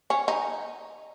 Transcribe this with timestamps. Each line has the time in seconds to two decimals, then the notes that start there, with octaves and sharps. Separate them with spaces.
0.10 C#4
0.28 D#4